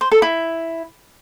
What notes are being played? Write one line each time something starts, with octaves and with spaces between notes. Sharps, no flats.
C5
A4
E4